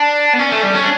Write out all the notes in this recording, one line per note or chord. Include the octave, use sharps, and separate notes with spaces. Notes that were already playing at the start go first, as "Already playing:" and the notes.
Already playing: D4
B3
C#4
A3
G3
C#4
D4